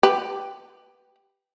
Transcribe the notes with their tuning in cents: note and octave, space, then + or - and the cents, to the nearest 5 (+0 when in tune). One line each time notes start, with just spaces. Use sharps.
G4 +0 B4 +0